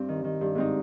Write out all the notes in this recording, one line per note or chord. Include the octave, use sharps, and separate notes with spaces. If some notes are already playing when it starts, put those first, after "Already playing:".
Already playing: G2 C4
D#3
D#3
G2
G#2 C4 D#4